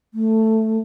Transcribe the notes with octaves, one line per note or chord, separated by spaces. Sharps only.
A3